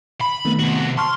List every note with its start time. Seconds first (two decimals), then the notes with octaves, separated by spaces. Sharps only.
0.21 B5
0.45 D#3 A3 B3
0.59 C3 F#4
0.98 A5 C6 C#6 F6